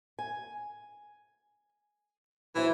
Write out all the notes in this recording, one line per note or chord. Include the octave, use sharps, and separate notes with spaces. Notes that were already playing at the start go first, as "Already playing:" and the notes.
G#5
E3 F#3 E4 C5